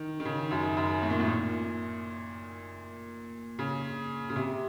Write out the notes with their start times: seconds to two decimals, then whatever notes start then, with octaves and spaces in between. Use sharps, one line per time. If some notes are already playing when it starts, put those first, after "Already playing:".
Already playing: D#3
0.20 D#3
0.25 C#3
0.51 F#2
0.77 F#2
1.02 A2
1.10 A#2
1.19 A2
1.29 A#2
3.59 C#3
4.30 C#3
4.36 C3